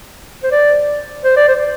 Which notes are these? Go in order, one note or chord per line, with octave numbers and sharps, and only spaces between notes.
C5
D5
C5
D5
C5